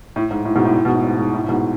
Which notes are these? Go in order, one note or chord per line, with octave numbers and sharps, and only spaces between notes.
A2
G#2
A2
G#2 B2
A2
A2
G#2 B2
A2
G#2
G#2
A2
A2
G#2 B2